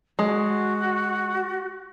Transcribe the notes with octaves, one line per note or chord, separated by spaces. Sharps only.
G#3 F#4